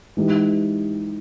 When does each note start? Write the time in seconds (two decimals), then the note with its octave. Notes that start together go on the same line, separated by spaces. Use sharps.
0.17 E3 G#3 D#4 G4